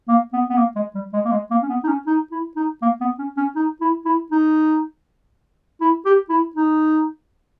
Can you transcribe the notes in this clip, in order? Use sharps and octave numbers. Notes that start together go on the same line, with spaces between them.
A#3
B3
B3
A#3
G#3
G3
G#3
A#3
G#3
A#3
C#4
B3
D#4
C#4
D#4
E4
D#4
A#3
B3
C#4
C#4
D#4
E4
E4
D#4
E4
G4
E4
D#4